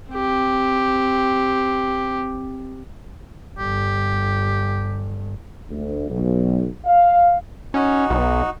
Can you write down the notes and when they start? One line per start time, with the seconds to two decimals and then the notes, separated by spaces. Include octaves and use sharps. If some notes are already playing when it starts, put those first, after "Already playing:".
0.11 C4 G4
3.58 G1 G4
5.71 D2
6.09 B1
6.85 F5
7.74 C#4 D#4 F#4
8.10 B1